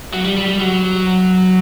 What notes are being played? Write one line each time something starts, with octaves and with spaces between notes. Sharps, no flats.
F#3
G3
G3
G3
F#3